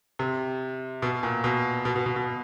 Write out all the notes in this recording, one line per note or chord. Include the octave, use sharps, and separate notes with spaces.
C3
B2
A#2
B2
B2
B2
B2
B2